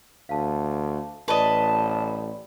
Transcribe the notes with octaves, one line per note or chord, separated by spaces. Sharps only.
D2 F5 A5
A1 B4 D5 D#5 A5 B5